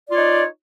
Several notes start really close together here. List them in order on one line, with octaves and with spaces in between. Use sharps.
D5 F4 C#5 D#4